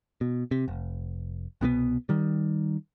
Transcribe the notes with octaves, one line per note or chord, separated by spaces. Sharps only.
B2
C3
F1
C2 B2 D#3 B3
D#3 G3